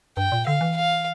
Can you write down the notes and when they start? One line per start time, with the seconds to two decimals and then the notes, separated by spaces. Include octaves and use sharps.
0.17 G2 G5
0.32 A#2
0.46 D3 F5
0.61 E3
0.76 F5